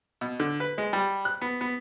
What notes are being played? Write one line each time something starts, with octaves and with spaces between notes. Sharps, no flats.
B2
D3
B4
G#3
G3
F#6
B3
B3